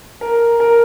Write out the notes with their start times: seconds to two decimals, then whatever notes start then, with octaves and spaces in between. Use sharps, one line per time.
0.21 A#4
0.60 A#4